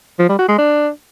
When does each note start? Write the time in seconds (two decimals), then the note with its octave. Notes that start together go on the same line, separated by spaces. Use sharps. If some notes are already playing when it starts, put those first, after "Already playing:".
0.19 F3
0.29 G3
0.39 F#4
0.48 G#3
0.58 D4